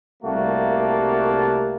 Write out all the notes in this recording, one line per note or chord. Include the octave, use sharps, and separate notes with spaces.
C2 G3 A3 A#3 F#4 A5